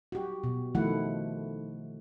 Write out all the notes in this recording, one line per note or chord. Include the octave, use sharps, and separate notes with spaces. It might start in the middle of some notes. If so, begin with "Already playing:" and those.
F#4 G4
B2
D#3 F3 A3 E4 F#5